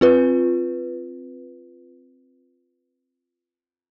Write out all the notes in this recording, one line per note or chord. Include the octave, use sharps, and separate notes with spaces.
C4 F4 B4